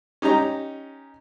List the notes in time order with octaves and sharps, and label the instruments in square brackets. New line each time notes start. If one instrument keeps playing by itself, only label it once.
[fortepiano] C#4 D#4 G4 A#5